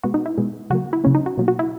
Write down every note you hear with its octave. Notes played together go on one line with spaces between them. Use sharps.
B2 G#3 B3 F#4
D#4
E4
B2 G#3 B3
C#3 F#3 A#3 F#4
E4
C#3 F#3 A#3 C#4
D#4
F#4
B2 F#3 A#3
F#4
E4